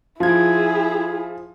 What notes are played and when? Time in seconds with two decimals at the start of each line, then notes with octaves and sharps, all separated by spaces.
0.20 F3 E4 F4 G#4 G#6